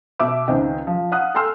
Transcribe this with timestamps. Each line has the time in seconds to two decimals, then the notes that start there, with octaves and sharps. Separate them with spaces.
0.19 B2 E5 D6 E6
0.48 C#2 D#3 C4 D#5 G5
0.87 F3
1.12 F5 F#5 D#6 F#6
1.35 A4 G5 G#5 C6 E6 F6